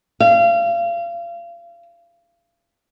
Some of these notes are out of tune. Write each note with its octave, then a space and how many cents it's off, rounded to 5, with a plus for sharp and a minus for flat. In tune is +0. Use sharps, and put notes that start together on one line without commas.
F5 -30